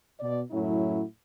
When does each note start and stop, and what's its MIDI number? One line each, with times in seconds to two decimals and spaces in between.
0.19 0.40 47
0.19 0.40 74
0.51 1.01 42
0.51 1.01 45
0.51 1.01 54
0.51 1.01 61
0.51 1.01 64